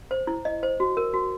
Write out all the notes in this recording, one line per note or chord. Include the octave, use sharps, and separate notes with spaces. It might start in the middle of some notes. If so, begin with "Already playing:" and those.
C5
E4
D#5
C5
F#4
A#4
F#4